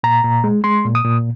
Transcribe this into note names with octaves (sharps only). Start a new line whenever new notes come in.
A#2 A#5
A#2
G#3
G#3 C6
A#2
D#6
A#2